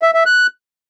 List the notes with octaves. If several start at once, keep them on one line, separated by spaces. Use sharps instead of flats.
E5
E5
F#6